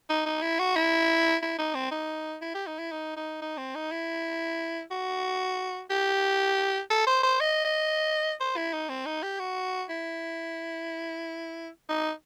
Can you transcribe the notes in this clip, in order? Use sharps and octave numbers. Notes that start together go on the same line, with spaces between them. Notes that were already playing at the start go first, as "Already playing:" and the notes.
D#4
D#4
E4
F#4
E4
E4
D#4
C4
D#4
E4
G4
D#4
E4
D#4
D#4
D#4
C4
D#4
E4
F#4
G4
A4
C5
C5
D#5
D#5
C5
E4
D#4
C4
D#4
G4
F#4
E4
D#4